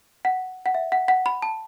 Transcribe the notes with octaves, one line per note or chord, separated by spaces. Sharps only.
F#5
F#5
E5
F#5
F#5
B5
A5